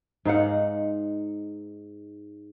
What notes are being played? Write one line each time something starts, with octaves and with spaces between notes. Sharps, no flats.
G#2 D#4 F5 F#5